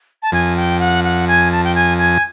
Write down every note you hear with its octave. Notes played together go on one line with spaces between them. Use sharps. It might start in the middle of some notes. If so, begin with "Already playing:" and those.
A5
F2 G#5
G5
F#5
F#5
G#5
A5
G5
G#5
G#5